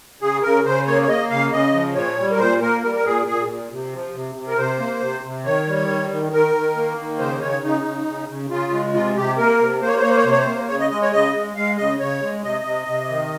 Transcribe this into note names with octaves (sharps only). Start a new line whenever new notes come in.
C#3 G#4
C#3 A#4
C#3 C5
A#3 C#5
C#5
A#3 D#5
C#3 F5
C#3 D#5
F3
A#2 C#5
G3
A#4
A#2 C5
A#3 A#4
G3 A#4
A#4
A#2 G#4
A#2 G#4
A#2
C3
F3
C3
C3
A#4
C3 C5
A#3
C3
C3
D#3 C#5
G3
D#3
D#3
D#3 A#4
D#3
A#3
D#3
C#3 C5
C#3 C#5
C#3 D#4
C#3
C#3
C#3
C#3 F4
G#3
C3 F4
C3 G4
A#3 A#4
C3
A#3 C5
C#5
C5
A#3 C#5
C5
C#5
C3 C5
C#5
C5
A#3
C#3 C#5
D#5
G#3 D#5
C#5
C#3 D#5
G#3
G#3 F5
C#3 D#5
C#3 C#5
G#3
C3 D#5
C3
C3
D#3